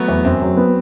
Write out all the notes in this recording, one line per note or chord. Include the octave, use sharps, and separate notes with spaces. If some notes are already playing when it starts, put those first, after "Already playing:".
Already playing: F#3 A3 B3
E2
F#2 C4
F#3
B3